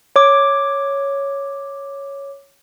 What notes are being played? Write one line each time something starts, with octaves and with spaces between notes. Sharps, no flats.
C#5 D6